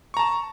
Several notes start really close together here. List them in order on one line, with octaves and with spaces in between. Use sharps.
C#6 A#5 A5